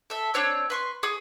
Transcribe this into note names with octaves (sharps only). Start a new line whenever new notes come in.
A4 E5
C4 D4 C#5 E6
B4 C6 C#6
G#4 C#6 D#6